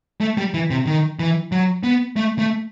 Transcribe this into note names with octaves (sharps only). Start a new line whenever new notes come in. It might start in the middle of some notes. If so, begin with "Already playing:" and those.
A3
G3
E3
C3
D#3
E3
F#3
B3
A3
A3